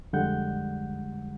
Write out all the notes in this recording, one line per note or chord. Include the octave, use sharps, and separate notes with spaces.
F2 D3 G3 G#3 F#5 G6